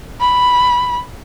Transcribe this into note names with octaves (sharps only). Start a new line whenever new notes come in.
B5